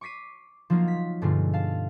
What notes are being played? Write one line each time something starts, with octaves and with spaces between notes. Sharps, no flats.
C#6 D6 B6 C7 D#7
F3 F#3 A#3 D#4 F4
B6
G2 B2 D3 G#3 A3 F4
F5 A5